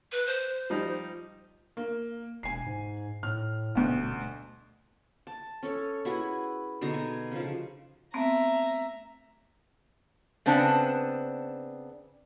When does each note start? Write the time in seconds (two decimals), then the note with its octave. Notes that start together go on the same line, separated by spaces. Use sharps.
0.12 B4
0.26 C5
0.70 F3 G3 D#4
1.77 A#3
2.43 E1 G#5 C7
2.66 G#2
3.23 A2 F6
3.75 D#1 D2 B2
5.27 A5
5.63 C#4 A4 C#5
6.05 E4 F#4 G#4 B4
6.81 B2 D3 D#4 A#5
6.94 G#5
7.31 C#3 F3
8.14 A3 B3 C4 E5 A#5
10.46 C#3 B3 C4 D4 A5